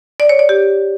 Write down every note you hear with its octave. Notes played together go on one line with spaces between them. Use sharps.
D5
C#5
D5
G4